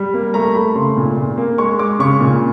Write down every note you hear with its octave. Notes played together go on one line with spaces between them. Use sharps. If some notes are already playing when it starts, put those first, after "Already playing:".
Already playing: G3
A#3
A3 A#5
A3 B5
C#3 C6
A#2
A#2
A#3
G#3 C#6
G#3 D6
C#3 C#6
A#2